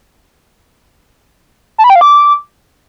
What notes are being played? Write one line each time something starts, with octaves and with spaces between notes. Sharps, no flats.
A5
B5
G5
F5
D6